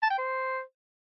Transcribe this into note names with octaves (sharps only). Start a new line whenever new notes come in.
A5
G5
C5